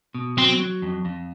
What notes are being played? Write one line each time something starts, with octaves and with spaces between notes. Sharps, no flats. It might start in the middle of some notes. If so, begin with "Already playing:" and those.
B2
F#3 C4
F#3
F2
F2